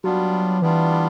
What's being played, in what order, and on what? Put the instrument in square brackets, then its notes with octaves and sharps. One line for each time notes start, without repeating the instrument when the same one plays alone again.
[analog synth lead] F#3 [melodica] G3 B3 D4 F4
[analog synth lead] E3 [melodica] G3 B3 D4 F4